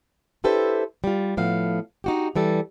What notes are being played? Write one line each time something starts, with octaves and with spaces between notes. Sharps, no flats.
D4 E4 G4 A4 B4 C5
G3 F4
A2 F3 B3 F5
D#4 F#4 G4
E3 G3 A4